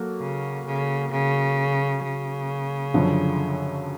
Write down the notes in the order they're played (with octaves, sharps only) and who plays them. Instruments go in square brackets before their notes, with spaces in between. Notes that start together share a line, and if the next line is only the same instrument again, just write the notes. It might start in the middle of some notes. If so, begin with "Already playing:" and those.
Already playing: [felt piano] F#3 A#3 F#4 A4
[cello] C#3
C#3
C#3
C#3
[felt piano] F#2 D3 F3